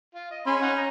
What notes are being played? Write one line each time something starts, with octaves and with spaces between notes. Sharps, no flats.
F4
D#5
C#4 G#4 B5 C6
D#4 F#5
D#5 A#5